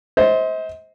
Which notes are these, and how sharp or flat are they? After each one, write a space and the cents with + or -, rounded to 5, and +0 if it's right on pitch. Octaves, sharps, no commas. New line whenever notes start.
C5 +0 D#5 +45